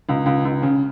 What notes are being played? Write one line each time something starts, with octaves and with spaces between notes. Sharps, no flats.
C#2
C#2
C#2
C#3